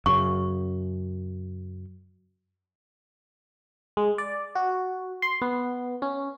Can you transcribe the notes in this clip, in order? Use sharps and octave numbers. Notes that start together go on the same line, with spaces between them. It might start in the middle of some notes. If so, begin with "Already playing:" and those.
F#2 C#3 C#6
G#3
D5
F#4
C6
B3
C#4